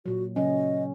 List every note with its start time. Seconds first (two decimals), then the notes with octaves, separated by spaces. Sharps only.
0.06 A#2 F#3 F#4
0.36 C#3 F#3 C#4 D#5